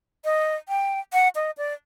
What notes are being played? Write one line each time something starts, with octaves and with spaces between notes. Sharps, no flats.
D#5
G5
F#5
D#5
D5